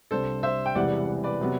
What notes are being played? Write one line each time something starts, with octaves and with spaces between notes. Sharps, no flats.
C2 C3 G3 D4 A4 C5
C5 E5
G5
E1 E2 C3 E3 G3 D5 F#5
B4 D5
C3 F#3 B3